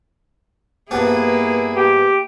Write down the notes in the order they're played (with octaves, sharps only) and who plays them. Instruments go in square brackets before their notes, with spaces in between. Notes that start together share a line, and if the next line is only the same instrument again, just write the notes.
[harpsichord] G2 F3 B3 [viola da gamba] A#3 E4 G#4
[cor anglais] G4